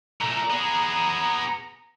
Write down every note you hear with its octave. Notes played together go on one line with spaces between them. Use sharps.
A#2 A3 A#5
B3 G#4